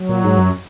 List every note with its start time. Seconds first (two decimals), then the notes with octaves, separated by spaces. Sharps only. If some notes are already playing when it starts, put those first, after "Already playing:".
Already playing: F#3
0.09 A#2
0.24 G#2
0.38 F#2